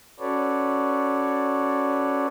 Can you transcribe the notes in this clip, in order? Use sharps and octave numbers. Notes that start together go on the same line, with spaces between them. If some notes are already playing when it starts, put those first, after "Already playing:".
C#4 F#4 A4 B4 C#5 D5